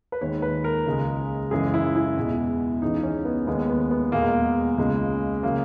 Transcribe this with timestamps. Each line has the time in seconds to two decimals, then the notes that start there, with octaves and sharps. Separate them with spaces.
0.12 B4
0.21 D#2 D#3 G#3 C#5
0.42 B4
0.64 A#4
0.86 C#2 C#3 G#3
1.51 F#2 C#3 E3 G#3 G#4
1.74 E4
1.95 E4
2.17 E2 B2 G#3
2.82 C#2 C#3 E3 D#4
3.03 C#4
3.25 B3
3.47 D#2 D#3 G#3 B3
3.70 B3
3.91 B3
4.12 E2 B2 G#3 A#3
4.78 C#2 C#3 G#3
5.43 C#3 F#3 A#3